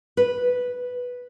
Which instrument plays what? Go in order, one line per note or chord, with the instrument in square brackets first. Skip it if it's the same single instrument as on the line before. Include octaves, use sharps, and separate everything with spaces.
[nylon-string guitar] B4